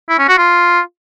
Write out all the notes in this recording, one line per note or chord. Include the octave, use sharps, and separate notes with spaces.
E4
C#4
F#4
F4